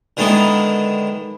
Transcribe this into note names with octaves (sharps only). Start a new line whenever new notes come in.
D3 D#3 G#3 B3 D#4 E4